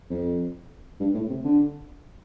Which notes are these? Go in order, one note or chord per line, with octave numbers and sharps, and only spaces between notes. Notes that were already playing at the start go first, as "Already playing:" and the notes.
F2
G2
A2
C3
D3